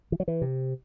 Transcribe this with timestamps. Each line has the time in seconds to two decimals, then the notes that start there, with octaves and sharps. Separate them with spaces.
0.12 E3
0.20 F#3
0.28 E3
0.42 C3